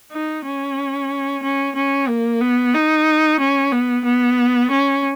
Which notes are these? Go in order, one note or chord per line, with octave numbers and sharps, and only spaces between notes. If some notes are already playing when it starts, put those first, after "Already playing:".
D#4
C#4
C#4
C#4
A#3
B3
D#4
C#4
B3
B3
C#4